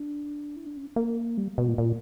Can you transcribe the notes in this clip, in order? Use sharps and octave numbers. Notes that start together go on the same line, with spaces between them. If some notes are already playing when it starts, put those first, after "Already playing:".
Already playing: D4
E4
D4
C#4
A#3
G3
B2
A#2
A#2